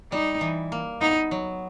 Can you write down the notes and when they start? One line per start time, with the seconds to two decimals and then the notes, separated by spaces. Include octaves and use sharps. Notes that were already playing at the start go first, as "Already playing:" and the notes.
0.12 G3 D#4
0.41 E3
0.72 A#3
1.01 B3 D#4
1.31 F#3